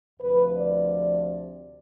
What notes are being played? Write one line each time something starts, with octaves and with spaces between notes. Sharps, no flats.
D2 C3 F3 B4
D5